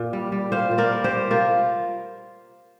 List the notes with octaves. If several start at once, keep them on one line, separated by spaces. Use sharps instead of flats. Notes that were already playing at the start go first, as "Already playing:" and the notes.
Already playing: A#2
G3
G3
A#2 C5 F5
A#2
A#4 D5
G3
G4 C5
G3
C3 F4 A#4